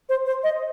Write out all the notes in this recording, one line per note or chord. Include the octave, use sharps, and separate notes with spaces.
C5
C5
D#5